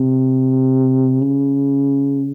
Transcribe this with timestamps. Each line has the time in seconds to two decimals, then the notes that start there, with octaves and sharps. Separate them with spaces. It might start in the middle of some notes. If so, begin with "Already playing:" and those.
Already playing: C3
1.21 C#3